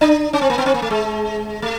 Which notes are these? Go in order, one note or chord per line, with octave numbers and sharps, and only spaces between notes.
D4
C#4
C4
A#3
B3
C4
A#3
A3
G#3
A3